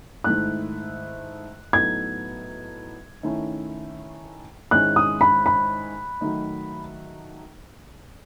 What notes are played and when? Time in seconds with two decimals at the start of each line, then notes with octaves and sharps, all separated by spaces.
0.24 G#2 D#3 A3 E4 F#6
1.73 A2 F#3 B3 D#4 A4 G#6
3.23 D#3 A3 C#4 E4
4.71 G#2 D#3 G#3 C#4 E4 F#6
4.96 D#6
5.21 B5
5.46 B5
6.21 D#3 F#3 A3 D#4